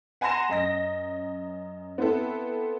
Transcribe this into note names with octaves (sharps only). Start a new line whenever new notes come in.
F#5 G#5 A#5 C6 A#6 E7
F#2 D#5 A#6
B3 C4 E4 A4